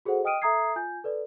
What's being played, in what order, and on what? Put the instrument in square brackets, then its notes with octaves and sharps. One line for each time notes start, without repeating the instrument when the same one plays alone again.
[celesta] F#4 G#4 A4 C5 F#5
D#5 G5 D#6 F6 D7 D#7
A4 E5 A#5 D#6 G#6 C7
F4 G#5 G6
A4 B4 D5